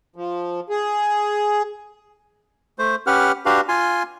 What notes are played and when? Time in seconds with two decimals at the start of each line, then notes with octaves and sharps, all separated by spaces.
0.16 F3
0.70 G#4
2.79 A3 C5
3.07 C#4 G4 B4 F#5 F6
3.46 D4 F#4 G4 B4 F5
3.69 F4 G#5 C6